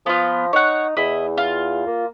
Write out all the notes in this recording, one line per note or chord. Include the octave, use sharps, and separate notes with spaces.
F3 B3 F4
D#4 C#5 F#5
E2 E4 D#5
F4
A#3